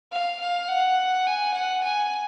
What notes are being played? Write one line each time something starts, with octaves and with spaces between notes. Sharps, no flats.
F5
F5
F#5
G#5
F#5
G#5